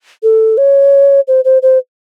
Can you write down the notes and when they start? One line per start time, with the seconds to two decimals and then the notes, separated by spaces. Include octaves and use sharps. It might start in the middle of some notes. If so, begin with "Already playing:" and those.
0.23 A4
0.58 C#5
1.28 C5
1.45 C5
1.62 C5